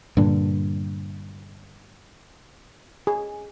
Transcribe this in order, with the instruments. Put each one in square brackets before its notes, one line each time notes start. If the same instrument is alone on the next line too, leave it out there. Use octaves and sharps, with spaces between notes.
[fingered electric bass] G2 A#2 D3
[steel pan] G#4